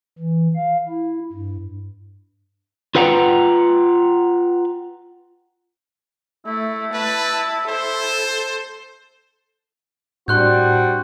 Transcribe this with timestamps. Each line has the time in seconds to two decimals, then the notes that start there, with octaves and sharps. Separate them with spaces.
0.19 E3
0.56 F5
0.89 E4
1.32 G2
2.95 F4 B4 F#5 G5 A#5
6.46 A3 E4
6.94 B4 A5
7.68 A4 C5
10.28 A2 G3 C4 D4 F#4 C6 F#6 G6